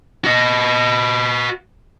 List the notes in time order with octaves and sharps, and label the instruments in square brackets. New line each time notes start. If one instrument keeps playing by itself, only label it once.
[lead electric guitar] F#4 D#5